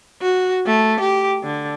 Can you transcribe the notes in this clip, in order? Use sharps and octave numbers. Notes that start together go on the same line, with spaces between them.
F#4
A3
G4
D3